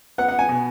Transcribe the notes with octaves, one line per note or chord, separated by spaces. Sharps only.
B3 F#5
F#5
G#5
B2